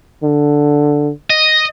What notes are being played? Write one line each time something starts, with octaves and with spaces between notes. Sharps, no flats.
D3
D#5